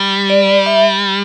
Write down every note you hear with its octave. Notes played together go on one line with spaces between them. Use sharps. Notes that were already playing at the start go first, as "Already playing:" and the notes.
Already playing: G3
D5
E5